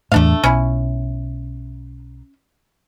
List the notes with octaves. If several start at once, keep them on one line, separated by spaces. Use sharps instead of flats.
E2 A2 A3 D4 F5
B1 C#4 E4